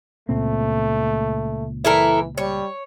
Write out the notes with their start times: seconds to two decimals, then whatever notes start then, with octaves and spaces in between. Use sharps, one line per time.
0.29 C#2 A#2 A3 C4
1.85 E3 E4 A4 A#4
2.38 G3 C#5